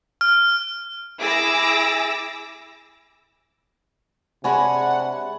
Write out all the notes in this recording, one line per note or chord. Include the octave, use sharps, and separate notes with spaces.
F6
E4 G#4 D6 E6 A#6
C3 G#3 D4 C#5 F#5 G#5 B5